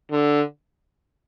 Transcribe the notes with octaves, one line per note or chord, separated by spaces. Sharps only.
D3